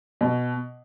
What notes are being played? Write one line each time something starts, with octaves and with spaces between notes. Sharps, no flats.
B2